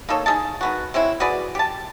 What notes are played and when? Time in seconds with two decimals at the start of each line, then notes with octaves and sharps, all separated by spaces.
0.09 A#3 D#4 A4 C#5
0.26 D#4 G#4 D#5 A5
0.61 D#3 B3 F#4
0.94 G#3 C4 C#4 E4
1.20 F#4 G#4 B4 D5
1.55 G4 A5